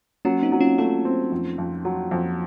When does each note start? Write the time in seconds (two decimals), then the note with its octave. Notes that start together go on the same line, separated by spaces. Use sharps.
0.25 F#3 A#3 C#4
0.43 C4 D#4
0.52 F#3
0.60 C#4 F4
0.78 A3 C#4 F4
1.05 C4
1.32 F2
1.58 F2
1.85 F#3
2.11 F2